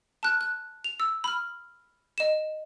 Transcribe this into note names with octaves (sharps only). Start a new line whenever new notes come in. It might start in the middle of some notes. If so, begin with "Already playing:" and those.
A5 F6 F#6
F#6
F7
E6
B5 F6
D#5 E7